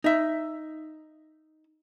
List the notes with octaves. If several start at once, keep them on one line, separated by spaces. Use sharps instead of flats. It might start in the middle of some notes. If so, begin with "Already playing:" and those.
D#4 E5